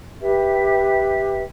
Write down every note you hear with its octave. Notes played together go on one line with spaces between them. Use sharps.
G4 B4 E5